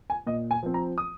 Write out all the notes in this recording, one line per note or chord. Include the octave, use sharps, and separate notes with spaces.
G#5
A#2 D#5
G#5
F3 C4
A#5
D#6